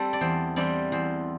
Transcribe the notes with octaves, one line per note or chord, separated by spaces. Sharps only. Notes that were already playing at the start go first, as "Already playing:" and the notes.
Already playing: G3 C4 G4 A4
D5
E2 C5
E3 G3 C4 D5
E2 C5